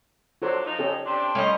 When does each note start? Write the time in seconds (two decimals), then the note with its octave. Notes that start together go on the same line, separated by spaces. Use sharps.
0.42 F#3 D4 F4 A4 C5
0.65 F3 D#4
0.79 C#4 G4 A4
1.06 C3 D4 G5 A5 C6
1.35 G3 A3 C#4 D#5 F5